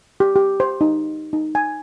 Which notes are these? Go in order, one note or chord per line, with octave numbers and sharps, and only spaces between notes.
G4
G4
C5
D#4
D#4
G#5